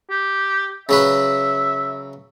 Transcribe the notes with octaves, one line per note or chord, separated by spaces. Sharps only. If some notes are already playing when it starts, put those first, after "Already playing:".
G4
C#3 F#3 B4 E5